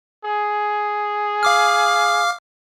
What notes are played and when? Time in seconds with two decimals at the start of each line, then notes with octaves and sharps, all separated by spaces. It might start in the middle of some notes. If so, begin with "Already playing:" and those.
0.25 G#4
1.43 F5 D6 F6